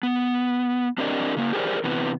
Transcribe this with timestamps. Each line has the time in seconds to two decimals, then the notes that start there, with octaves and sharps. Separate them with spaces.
0.03 B3
0.98 C4 D4 G4 A#4 D5 D#5
1.37 C#3 A#3
1.53 G4 G#4 A#4 C5 D5
1.84 C3 E3 B3